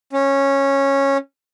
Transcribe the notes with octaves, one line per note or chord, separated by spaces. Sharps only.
C#4